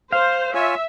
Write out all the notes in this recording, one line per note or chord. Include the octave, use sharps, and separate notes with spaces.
C5 F5
F4 C#5 E5 G#5